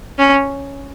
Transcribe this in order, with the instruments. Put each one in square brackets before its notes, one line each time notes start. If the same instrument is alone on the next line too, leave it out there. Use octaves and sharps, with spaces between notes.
[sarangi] C#4